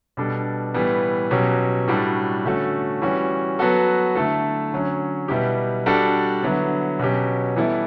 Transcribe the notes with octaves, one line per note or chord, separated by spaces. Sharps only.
B2 G3 D4 A4
A2 E3 G3 B3
B2 F#3 C#4 G4
A2 G3 D4 F#4 A4
D3 A3 C#4 F#4 A4
E3 G3 C#4 F#4
F#3 B3 F#4 A4
D3 A3 E4 A4
D3 F#3 C#4
B2 G3 B3 E4 G4
G3 D4 F#4 A4
D3 F#3 B3 E4
B2 F#3 C#4 G4
E3 G3 B3 E4 A4